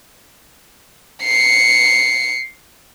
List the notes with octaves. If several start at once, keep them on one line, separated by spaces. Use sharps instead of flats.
C7 C#7